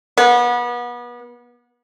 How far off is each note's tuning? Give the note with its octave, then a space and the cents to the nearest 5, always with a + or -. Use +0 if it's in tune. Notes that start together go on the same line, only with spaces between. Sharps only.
B3 -30